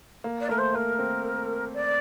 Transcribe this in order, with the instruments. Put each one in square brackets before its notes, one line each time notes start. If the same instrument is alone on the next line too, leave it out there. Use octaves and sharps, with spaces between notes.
[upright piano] A#3
[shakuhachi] D5
[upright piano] A3 [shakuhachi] A#4
[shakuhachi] C5
[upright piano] A#3 [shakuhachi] A#4
[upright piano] C4
[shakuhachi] D5